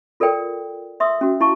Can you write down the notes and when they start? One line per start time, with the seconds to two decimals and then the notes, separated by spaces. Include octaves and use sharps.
0.20 F4 A4 A#4 D5 G5
1.00 E5 C6 D#6 E6
1.21 C#4 F#4
1.41 E4 F5 A5 C#6